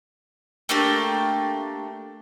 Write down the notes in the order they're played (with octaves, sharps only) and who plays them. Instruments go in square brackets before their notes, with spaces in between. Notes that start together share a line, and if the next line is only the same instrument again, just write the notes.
[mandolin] A3 A#3 D4 G4